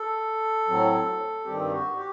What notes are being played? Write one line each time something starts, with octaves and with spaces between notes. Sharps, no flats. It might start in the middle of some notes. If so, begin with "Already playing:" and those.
Already playing: A4
A2 F#3 C4
G2 D#3 G3 C4 G4
F#4
G4